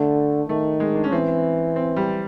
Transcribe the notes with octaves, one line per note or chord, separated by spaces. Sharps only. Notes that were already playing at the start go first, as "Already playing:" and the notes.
Already playing: D3 A3
D#3 A3
G#3
D4
C#4
E3 C4
C4
G3